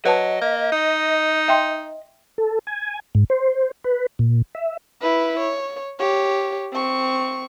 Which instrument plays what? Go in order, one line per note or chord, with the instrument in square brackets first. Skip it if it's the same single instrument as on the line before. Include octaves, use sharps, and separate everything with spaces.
[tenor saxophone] F#3 [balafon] B4 A5 [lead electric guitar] D#5
[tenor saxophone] A#3
D#4
[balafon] E5 G5 C6
[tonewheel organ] A4
G#5
G#2
C5
B4
A#2
E5
[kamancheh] E4 B4
C#5
G4 C#5
C4 C#6